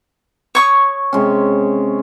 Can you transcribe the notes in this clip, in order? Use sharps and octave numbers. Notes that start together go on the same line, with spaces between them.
C#5 C#6 D#6
C3 G#3 C#4